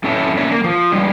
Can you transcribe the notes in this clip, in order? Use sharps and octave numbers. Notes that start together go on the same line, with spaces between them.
F#2 C#4 E4 A4 C#5 E5
A#3 C#4 C#5 D5 E5
A#3
F3
G#2 G3 G#3